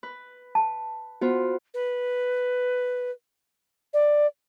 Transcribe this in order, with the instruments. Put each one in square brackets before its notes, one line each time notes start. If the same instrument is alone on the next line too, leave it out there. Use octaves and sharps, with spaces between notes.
[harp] B4
[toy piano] A5
[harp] B3 F4 [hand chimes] F#4 C5
[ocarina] B4
D5